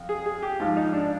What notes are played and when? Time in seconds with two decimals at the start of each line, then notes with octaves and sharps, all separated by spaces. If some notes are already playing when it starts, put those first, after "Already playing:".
Already playing: F2
0.09 G#4
0.26 G#4
0.42 G4
0.60 G#2 F3 F4
0.77 D#4
0.93 D4